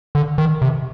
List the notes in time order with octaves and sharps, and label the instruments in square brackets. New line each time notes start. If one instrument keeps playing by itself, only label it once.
[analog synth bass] D3
D#3
C3